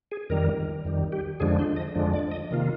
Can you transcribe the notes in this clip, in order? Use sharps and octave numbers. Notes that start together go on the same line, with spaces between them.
G#4
F2 D#3 G3 A#4
F2 D#3 G3
G4
F2 D3 F3 G#3 D4 G#4
C5
D#5
F2 D3 F3 G#3 D4
D5
D#5
C3 D#3 A#3 F4